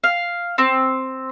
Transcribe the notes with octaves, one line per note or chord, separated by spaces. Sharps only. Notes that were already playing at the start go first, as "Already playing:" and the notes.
F5
C4